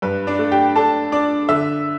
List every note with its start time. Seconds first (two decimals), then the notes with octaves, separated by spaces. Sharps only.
0.02 G2 B4
0.27 D4 D5
0.39 A3
0.52 G4 G5
0.76 D4 A4 A5
1.12 D4 D5 D6
1.49 D3 E5 E6